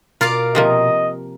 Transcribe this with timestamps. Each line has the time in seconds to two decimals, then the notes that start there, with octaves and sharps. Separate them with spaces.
0.21 B2 F4 A#4 D5 F5
0.55 C3 F3 A#3 D#5